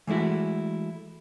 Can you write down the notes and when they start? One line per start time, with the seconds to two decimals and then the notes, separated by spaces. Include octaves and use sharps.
0.07 E3 G#3 A3 E4 F#4